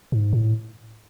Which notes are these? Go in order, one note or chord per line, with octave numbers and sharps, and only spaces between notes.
G#2
A2